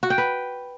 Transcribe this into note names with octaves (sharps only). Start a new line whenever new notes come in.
F#4
G5
B4